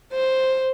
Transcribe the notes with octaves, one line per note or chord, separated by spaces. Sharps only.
C5